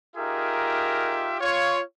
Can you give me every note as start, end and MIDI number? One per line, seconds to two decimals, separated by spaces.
0.15 1.36 63
0.15 1.36 65
0.15 1.36 67
0.15 1.36 68
0.15 1.36 70
0.15 1.36 76
1.40 1.81 65
1.40 1.81 73